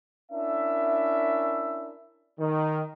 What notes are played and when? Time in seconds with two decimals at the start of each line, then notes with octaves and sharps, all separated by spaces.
0.32 C#4 D4 E4 A#4 E5
2.39 D#3